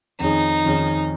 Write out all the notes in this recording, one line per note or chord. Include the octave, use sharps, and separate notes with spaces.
F2 D#3 C#4 D#4 G#4
F2 D#3 C#4 G#4